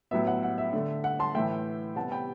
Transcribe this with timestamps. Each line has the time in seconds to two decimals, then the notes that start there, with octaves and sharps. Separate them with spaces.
0.11 A2 F#3 B3 E5
0.27 F#5
0.43 F#5
0.58 E5
0.73 D3 A3
1.04 F#5
1.19 A5 C6
1.34 A2 E3 A3 E5 G5
1.96 C3 G3 B3 F#5 A5
2.11 G5 B5